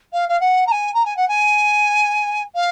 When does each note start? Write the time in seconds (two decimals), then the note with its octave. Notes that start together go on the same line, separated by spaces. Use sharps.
0.13 F5
0.29 F5
0.40 F#5
0.67 A#5
0.71 G#5
0.94 A#5
1.05 G#5
1.17 F#5
1.28 G#5
2.55 F5